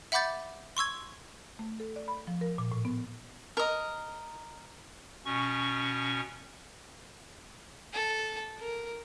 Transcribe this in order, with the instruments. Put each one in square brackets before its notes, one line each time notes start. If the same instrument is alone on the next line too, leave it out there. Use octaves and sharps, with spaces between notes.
[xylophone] E5 F#5 B5 D6 G6 A6
C6 C#6 E6 G#6
[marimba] A3
A4
D5
B5
F3
A#4
A#2
A2
B3
[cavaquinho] A#4 D#5
[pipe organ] B2 C#4 C#6
[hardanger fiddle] A4
A#4